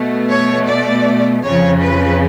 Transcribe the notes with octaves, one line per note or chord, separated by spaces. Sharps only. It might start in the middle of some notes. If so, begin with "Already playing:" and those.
Already playing: B2 A3
C#5
D5
F2 C#3 F3 C#5
B4